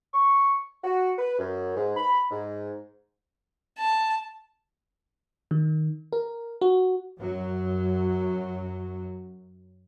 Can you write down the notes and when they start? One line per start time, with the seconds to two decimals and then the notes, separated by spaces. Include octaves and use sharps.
0.14 C#6
0.84 F#4
1.18 B4
1.38 F#2
1.76 G#2
1.97 B5
2.31 G#2
3.79 A5
5.51 D#3
6.13 A#4
6.61 F#4
7.19 F#2 F#3